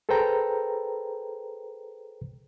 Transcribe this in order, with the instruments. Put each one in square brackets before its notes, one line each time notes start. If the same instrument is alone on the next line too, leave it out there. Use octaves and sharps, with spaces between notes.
[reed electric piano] G#4 A4 B4 C5 G5 A#5